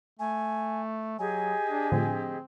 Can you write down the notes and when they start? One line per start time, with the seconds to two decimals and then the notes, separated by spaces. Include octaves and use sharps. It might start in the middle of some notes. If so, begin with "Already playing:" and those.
0.19 A3 G#5
1.19 F#3 G4 G#4 D#5 G#5
1.69 D4
1.92 A2 D3 F3 C4